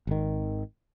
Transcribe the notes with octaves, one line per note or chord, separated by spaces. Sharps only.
G#1 D#3